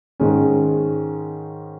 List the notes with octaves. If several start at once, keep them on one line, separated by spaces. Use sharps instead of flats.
G#2 D#3 G#3 C#4